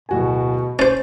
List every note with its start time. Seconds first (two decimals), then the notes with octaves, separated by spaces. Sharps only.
0.09 D1 B2 F#4 G#5
0.79 C#4 C5 A6